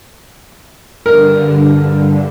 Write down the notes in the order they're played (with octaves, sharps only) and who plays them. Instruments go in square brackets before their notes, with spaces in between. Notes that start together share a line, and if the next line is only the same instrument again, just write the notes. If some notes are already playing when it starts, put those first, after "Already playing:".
[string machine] G2 D3 [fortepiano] A#4